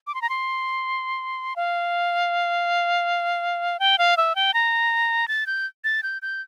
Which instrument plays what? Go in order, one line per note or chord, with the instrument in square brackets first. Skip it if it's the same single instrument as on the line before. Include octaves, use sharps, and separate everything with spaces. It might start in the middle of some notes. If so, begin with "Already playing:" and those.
[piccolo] D6
C6
A#5
C6
F5
G5
F5
E5
G5
A#5
A6
G6
A6
G6
G6